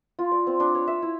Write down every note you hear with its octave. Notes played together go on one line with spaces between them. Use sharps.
F4
D5
C4
D4
C#5
E5
E4